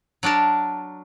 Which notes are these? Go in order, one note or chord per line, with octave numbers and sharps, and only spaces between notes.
F#3 D4 A#4 A5